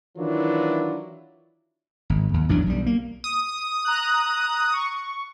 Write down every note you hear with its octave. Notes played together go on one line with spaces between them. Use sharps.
D#3 E3 F#3 D4 E4 F4
G#1
D#2
A1 E2 F#3 D4
B1 G3
A#3
D#6
A#5 F#6
C#6